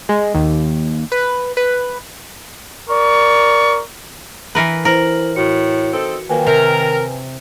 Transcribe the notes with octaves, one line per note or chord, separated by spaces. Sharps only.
G#3
D#2
B4
B4
A#4 D5 C#6
E3 A#4 B4
E4 A#4 C5 F#7
A2 F#4 C#7
C4 D#4 A4
D#3 F3 F#3 A#3 B4 G5 G#5
C3 A#4